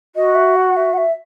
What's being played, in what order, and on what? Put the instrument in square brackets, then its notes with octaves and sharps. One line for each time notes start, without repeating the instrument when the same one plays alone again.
[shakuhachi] F#4 [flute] D#5
[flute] E5
F#5
E5
F#5
E5